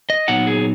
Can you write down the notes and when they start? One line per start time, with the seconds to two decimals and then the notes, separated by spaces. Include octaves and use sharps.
0.10 D#5
0.28 A#2 F#3 B3 D#4 F#5
0.47 G#4